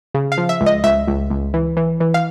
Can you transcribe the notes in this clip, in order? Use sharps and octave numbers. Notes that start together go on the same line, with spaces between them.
C#3
F5
F3
E5
C#2
D#5
C#2 E5
C#2
C#2
E3
E3
E3
F5